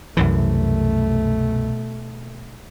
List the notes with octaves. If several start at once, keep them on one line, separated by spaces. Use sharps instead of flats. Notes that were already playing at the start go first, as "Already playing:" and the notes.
C2 F#2 B2 E3 A3